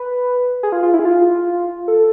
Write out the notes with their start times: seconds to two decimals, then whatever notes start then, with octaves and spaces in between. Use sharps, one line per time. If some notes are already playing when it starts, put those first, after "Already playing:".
Already playing: B4
0.63 G#4
0.72 F4
0.83 F4
0.94 E4
0.99 G#4
1.05 F4
1.88 A4